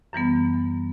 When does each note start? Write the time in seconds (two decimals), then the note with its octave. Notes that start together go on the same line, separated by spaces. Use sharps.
0.13 F#2 E3 G3 B3